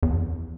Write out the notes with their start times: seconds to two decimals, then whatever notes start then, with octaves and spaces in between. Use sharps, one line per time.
0.03 E2
0.13 F2
0.24 E2